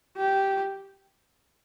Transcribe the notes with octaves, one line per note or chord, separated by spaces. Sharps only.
G4